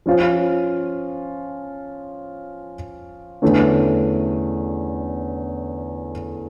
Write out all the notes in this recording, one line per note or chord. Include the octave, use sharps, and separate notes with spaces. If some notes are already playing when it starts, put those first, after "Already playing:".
F3 C#4 F4
E2 D3 A3 C#4